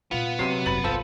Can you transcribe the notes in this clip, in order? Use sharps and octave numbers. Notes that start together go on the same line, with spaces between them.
A#2 G3 B3 F4 F7
C3 D#3 F#3 C7 D#7
F1 G2 B5 A6 F#7
G1 C2 F4 A4 C5